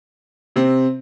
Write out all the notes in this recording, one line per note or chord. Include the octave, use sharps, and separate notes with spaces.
C3 C4